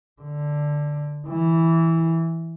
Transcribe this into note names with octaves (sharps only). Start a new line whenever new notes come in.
D3
E3